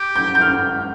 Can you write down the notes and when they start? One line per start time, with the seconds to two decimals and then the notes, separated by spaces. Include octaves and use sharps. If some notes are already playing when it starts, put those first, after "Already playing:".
Already playing: G4
0.16 G6
0.35 G6
0.41 F6